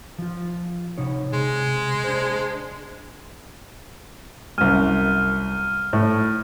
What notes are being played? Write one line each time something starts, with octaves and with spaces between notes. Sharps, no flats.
F3 F4
C3 D#4 C#5
C3 G#3
D4 C5
C2 F#2 F6 D#7
A2